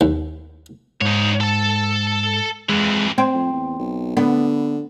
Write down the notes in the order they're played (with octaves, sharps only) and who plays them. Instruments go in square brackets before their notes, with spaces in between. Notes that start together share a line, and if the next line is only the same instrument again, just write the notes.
[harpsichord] D#2
[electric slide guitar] G#2 [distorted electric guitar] D#4 C#5
[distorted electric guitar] A4 A5
[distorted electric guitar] F2 E3 [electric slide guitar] G#3
[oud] C4
[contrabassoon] F2
E2
B1
[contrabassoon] D3 [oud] B3